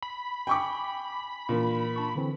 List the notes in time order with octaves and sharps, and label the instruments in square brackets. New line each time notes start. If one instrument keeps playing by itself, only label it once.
[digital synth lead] B5
[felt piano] G5 C#6 D6 [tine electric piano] G#5
[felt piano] A#2 [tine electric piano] E3 D4 F4
[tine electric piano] D4 A5 C#6
D3 E3 C4